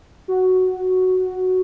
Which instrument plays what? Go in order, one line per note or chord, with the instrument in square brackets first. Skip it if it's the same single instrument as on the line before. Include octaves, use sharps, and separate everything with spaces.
[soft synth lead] F#4